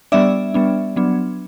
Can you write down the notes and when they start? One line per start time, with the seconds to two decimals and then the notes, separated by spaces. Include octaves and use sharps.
0.12 G3 B3 D4 D5 E5
0.54 G3 B3 D4
0.96 F#3 B3 D4